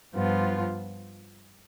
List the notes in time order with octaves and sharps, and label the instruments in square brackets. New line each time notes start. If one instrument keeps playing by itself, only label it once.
[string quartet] G2 F3 B3 F4